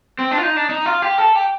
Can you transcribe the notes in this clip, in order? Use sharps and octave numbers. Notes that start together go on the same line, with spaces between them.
C4
D4
F4
D#4
D4
D#4
F4
G4
A4
G4